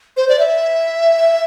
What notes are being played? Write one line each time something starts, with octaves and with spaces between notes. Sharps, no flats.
C5
D5
E5